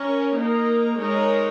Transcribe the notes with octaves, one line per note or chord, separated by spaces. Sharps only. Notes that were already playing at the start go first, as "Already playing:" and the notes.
Already playing: C#4 A#4 C#5
A#3 D#4 A#4
G#3 D#4 A#4 C#5